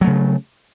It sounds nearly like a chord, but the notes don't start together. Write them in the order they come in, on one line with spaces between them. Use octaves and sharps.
F#3 A3 C#3